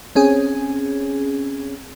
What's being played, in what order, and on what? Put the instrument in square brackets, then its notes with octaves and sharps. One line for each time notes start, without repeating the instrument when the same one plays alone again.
[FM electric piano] C4 C#4 G#4